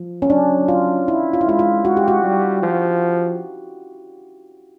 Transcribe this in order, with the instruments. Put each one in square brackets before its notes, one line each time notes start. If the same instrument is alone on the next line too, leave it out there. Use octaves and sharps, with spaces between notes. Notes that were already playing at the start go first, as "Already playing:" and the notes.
Already playing: [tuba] F3
[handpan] C#4
[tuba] F#3 [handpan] D4
[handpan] F4
E4
F4
E4
[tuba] G#3 [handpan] F4
[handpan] F4
[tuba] G#3 [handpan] F#4
[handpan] G4
F#4
[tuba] G3
F3